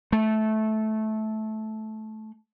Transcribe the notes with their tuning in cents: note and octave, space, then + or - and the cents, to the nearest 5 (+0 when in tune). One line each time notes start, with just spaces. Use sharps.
A3 -15